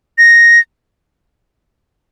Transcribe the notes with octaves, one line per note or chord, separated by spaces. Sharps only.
A#6